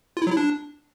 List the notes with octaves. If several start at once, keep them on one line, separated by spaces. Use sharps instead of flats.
F4
E4
F#3
E4
D4